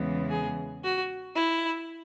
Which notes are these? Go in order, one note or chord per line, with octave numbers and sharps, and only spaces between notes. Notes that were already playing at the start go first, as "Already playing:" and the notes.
Already playing: E2 C#3 E3 G#3 B3
G#4
F#4
E4